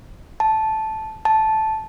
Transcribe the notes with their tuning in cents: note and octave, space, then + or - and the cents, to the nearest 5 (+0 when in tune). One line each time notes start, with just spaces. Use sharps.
A5 -10
A5 -10